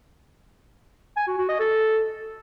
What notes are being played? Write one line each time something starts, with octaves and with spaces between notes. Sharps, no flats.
G#5
F#4
F#4
D#5
A4